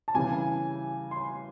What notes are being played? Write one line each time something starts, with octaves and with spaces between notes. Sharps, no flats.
A5
C#3 E3 G3 G#5
C6